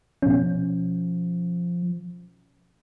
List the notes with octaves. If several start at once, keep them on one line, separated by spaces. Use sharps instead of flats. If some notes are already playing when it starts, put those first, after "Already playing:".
B2 F3 C#4